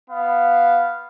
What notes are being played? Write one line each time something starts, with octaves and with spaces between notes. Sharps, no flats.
B3 F5